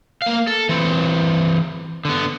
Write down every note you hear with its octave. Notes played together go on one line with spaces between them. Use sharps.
A#3 F5
A4
E3 C4
D3 B3